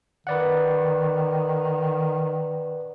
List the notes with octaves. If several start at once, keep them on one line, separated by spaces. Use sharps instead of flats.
D#3 B4 D5 F#5